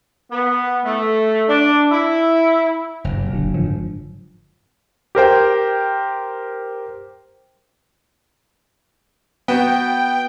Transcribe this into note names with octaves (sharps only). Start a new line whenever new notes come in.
B3
A3
D4
E4
F#1 G2
C3
E1 A#1 D3 F#3
G#2 D3 F3 F#3
G4 A#4 C5 G5
B3 F#4 G5